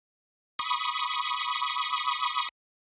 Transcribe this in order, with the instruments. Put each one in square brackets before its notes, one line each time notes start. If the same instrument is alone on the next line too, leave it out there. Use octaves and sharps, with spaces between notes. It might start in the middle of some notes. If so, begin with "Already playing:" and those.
[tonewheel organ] B5 C#6 D#6